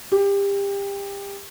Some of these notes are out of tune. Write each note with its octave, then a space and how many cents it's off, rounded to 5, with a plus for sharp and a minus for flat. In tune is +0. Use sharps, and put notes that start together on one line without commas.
G4 +25